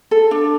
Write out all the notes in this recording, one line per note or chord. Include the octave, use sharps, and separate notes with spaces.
A4
D4